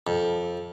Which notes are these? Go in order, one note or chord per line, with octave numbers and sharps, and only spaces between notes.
F2